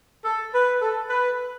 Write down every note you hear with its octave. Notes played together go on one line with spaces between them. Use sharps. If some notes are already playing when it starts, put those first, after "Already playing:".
A4
B4
A4
B4